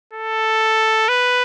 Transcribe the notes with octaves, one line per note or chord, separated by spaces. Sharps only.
A4
B4